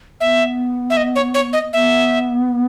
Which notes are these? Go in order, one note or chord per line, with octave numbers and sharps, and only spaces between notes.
B3 E5
E5
D#5
C#5
C#5
D#5
B3 E5